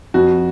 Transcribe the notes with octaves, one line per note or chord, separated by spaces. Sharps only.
F2 F#4